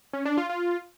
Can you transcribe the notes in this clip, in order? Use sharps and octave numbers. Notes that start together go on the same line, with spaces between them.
C#4
D4
F4
F4